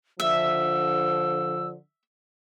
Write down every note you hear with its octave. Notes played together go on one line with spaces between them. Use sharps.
D3 F3 E5 E6